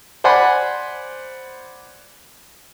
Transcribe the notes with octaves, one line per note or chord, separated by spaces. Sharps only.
C5 D5 F#5 G#5 B5 C6